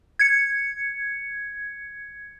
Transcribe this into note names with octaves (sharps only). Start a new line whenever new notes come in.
G#6 C#7